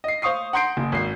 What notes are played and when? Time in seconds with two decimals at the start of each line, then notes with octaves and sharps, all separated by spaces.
0.04 D#5 C7
0.22 C5 F5 C#6 D#6 C7
0.53 F#5 A#5 C6 G6 C7 D7
0.77 F#1
0.92 G#1 C7